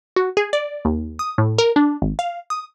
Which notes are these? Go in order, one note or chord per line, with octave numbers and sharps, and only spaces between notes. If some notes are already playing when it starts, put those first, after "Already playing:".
F#4
G#4
D5
D#2
D#6
A2
A#4
D4
G#1
F5
D#6